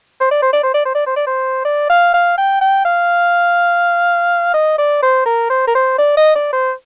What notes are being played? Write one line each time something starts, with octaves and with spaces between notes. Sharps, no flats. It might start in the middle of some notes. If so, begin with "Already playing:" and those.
C5
D5
C5
D5
C5
D5
C5
D5
C5
D5
C5
D5
F5
F5
G5
G5
F5
D#5
D5
C5
A#4
C5
A#4
C5
D5
D#5
D5
C5